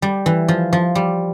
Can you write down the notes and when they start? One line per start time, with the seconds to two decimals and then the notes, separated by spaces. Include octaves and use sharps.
0.02 G3
0.26 E3
0.48 F3
0.73 F3
0.95 G3